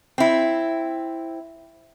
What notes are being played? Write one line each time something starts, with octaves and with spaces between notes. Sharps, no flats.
C4 E4